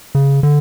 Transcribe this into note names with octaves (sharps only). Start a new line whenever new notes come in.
C#3
D3